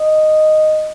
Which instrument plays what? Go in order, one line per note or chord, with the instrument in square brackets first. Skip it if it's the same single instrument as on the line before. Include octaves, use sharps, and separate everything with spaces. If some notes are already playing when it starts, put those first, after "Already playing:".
Already playing: [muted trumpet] D#5